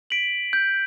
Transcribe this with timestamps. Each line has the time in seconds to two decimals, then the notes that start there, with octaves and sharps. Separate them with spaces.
0.10 B6 D7 F#7
0.53 G6